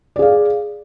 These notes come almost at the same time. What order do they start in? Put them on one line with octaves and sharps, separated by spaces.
D5 G#4 F5